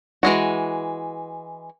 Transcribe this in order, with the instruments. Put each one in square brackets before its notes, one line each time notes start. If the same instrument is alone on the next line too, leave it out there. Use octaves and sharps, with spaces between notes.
[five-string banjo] E3 G#3 F#4